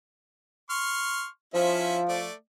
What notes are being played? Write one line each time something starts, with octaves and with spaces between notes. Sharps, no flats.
C6 C#6 F6
F3 C#4 E4 E5
A3 D5